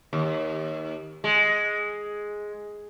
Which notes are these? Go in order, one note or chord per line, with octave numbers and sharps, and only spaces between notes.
D#2
G#3